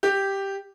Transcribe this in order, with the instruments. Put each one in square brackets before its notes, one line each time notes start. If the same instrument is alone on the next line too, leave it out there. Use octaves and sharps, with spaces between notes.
[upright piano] G4